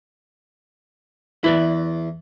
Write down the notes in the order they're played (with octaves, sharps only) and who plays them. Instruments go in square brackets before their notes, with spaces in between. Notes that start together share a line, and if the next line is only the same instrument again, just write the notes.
[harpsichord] E2 [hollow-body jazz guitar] E4 B4 D5